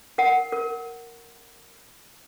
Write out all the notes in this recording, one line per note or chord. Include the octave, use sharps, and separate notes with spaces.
A#4 F#5
A#4